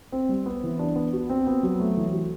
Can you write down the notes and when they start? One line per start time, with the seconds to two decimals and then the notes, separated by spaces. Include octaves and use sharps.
0.12 C4
0.29 G3
0.46 B3
0.64 E3
0.79 D4
0.96 B3
1.13 F#4
1.30 C4
1.47 B3
1.63 F#3
1.80 A3
1.97 E3
2.13 F#4